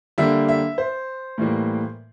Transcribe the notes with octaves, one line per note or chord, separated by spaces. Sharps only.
D3 G3 A#3 E5
E5
C5
A2 E3 G3 A#3